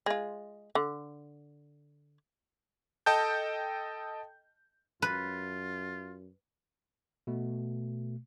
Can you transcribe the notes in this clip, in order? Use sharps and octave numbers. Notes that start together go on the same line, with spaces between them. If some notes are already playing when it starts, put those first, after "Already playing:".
G#3 F4
D3
A4 D#5 G5 A5 G6
F#2 F4 B4
B2 A3